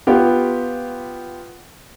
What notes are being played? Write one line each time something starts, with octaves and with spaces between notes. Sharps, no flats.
B3 F4 G4